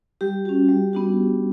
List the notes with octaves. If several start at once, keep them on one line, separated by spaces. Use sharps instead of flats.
G3 G4
C#4 F#4
G3
B3 D4 F#4